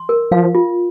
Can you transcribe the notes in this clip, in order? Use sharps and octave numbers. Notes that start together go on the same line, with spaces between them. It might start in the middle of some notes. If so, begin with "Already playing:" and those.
Already playing: C6
A#4
F3 F5
F4